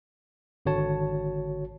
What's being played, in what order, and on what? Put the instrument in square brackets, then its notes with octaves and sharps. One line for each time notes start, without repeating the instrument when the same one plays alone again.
[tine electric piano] G#1 D3 F#4 C#5 A5